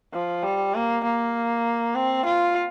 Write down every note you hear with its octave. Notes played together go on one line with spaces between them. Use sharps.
F3
G3
A#3
A#3
C4
F4